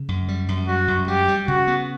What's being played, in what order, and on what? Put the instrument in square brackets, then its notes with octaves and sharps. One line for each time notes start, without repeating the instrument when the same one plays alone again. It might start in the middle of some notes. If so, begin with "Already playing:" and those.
Already playing: [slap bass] C#3
F#2
G3
F#2
[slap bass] G3 [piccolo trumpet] F#4
[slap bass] F#2
[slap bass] G3 [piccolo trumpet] G4
[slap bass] G3
[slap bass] C#3 [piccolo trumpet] F#4
[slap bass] B3